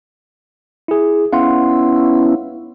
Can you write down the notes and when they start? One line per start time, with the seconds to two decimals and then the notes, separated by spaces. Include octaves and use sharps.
0.88 E4 G#4
1.33 B3 C#4 E4 F5 F#5 C6